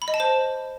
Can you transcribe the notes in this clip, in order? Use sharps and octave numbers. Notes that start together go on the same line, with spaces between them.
B5
D#5
A5
C5